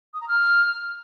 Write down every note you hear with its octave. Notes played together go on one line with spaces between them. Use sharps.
D#6
A#5
F6